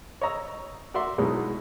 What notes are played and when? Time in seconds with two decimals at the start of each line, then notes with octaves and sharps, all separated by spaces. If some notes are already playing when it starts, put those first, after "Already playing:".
0.21 C#5 D#5 A#5 E6
0.94 F#4 D5 E5 C6
1.18 B2 F#3 G#3 B3 D#4 E4